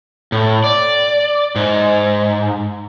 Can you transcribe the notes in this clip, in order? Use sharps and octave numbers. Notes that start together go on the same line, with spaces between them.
A2
D5
G#2